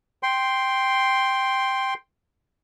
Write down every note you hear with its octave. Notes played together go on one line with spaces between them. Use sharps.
G5 C6